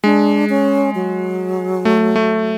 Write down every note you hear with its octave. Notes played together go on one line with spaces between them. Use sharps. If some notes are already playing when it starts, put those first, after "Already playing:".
G#3 D4
C#4
F#3
A3
A3